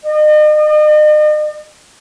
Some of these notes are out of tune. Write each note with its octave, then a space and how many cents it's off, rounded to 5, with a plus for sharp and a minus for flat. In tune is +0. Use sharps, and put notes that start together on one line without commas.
D#5 -40